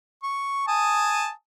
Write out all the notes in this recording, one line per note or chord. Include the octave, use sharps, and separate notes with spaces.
C#6
G#5 A5 D#6